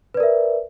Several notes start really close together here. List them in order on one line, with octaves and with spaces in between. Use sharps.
B4 D5 A#4 E5